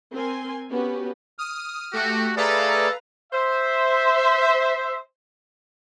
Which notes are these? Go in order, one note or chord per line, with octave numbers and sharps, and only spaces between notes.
C4 A#4 G#5 C6
B3 C#4 F#4 G4 B4
D#6 F6
A3 F#4 G4
A3 G#4 A4 B4 D5 F5 A#5
C5 E5